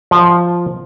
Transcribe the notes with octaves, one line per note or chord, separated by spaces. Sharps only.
F3